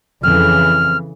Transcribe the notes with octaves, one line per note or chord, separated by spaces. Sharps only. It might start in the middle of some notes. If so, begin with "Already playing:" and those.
F2 C#3 E3 F6